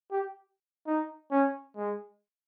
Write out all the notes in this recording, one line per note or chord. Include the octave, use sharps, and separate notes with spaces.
G4
D#4
C#4
G#3